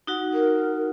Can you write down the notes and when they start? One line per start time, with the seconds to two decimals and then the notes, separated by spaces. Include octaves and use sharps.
0.07 D#4 F#4 F#5
0.33 A#4